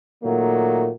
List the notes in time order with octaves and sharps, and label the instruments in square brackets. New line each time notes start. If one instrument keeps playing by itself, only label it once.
[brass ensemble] A#2 D#3 F#3 A3 A#3